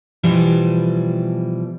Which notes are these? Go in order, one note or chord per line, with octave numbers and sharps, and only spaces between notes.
B2 E3 F3 G3